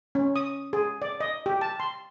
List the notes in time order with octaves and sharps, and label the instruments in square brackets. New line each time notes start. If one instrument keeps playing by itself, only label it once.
[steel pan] C#4
D#6
G#4
D5
D#5
G4
A5
C6